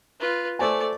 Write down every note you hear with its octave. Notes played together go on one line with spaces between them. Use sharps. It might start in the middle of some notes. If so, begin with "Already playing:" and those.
F4 B4
A3 A4 C5 D5 G#5